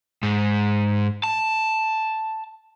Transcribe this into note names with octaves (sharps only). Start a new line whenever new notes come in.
G#2
A5